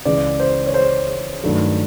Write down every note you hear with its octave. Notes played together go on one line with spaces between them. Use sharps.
C#2 C#3 E3 D5
C5
C#5
C5
G2 D#3 F#3 A3